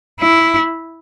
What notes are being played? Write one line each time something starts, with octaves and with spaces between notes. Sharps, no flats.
E4